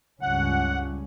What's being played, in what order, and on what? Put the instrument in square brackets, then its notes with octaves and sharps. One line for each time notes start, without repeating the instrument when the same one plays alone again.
[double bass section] C#2 G2 C#4 [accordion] F#5